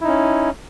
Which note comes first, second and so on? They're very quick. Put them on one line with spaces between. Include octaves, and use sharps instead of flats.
E4 D#4 C#4